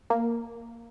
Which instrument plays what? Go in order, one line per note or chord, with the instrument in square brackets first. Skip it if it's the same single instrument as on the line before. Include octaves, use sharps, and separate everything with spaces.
[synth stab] A#3